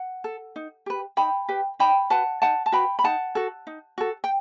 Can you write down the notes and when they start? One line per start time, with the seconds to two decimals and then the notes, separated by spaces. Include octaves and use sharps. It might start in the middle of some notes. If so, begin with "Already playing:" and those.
Already playing: F#5
0.24 A4
0.56 D#4
0.86 G4 B4
1.17 D#4 G5 B5
1.49 G4 B4
1.79 D#4 G5 B5
2.10 F#4 B4 F#5 A5
2.42 D#4 F#5 A5
2.66 A5
2.72 F#4 B4 G5 B5
2.99 B5
3.04 D#4 F#5 A5
3.35 F#4 A4
3.67 D#4
3.98 F#4 A4
4.24 G5